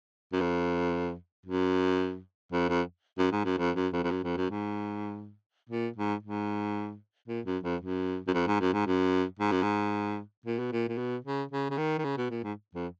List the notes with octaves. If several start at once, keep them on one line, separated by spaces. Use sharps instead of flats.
F#2
F2
F#2
F2
F2
F#2
G#2
F#2
F2
F#2
F2
F2
F#2
F2
F#2
G#2
A#2
G#2
G#2
A#2
F#2
F2
F#2
F#2
F2
G#2
F#2
G#2
F#2
G#2
F#2
G#2
A#2
B2
A#2
A#2
B2
C#3
C#3
C#3
D#3
D#3
C#3
B2
A#2
G#2
F2